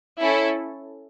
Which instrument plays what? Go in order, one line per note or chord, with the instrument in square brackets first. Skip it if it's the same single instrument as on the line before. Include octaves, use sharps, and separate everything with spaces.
[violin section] C#4 E4 A4